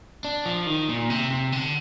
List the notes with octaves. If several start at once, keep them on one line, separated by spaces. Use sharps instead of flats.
D4
F3
D#3
A#2
C3
C3
D3